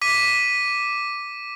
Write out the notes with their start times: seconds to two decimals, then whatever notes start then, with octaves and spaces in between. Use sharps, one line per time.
0.02 D6 B6 D#7